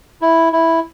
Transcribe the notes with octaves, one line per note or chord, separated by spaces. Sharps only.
E4
E4